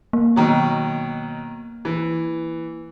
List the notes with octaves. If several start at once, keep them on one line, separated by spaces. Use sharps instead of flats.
A#3
B2 D#3 F#3
E3